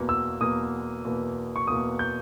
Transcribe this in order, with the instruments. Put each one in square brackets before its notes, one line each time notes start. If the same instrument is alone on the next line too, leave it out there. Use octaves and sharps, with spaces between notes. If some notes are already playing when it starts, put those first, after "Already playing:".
Already playing: [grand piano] E2 B2 A#3
E6
E2 B2 A#3 D#6
E2 B2 A#3
C#6
E2 B2 A#3 D#6
G6